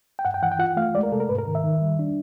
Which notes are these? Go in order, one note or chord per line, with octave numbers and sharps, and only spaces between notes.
G5
G2 F#5
G5
E3 F#5
G5
F4 F#5
A3 F5
G#3 D5
A#4
C3 A4
A#4
G#2 B4
A#4
D#3
E5
D#3
G3
D4